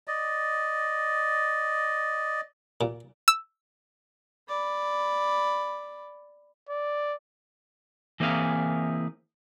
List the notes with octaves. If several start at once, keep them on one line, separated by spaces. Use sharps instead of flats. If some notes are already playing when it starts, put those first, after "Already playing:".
D5 D#5
A#2
E6
D5 B5
D5
E3 A#3 C4 E4 G#4 F5